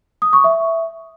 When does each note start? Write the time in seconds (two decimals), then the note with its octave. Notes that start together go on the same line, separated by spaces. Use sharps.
0.22 D#6
0.33 C#6
0.44 E5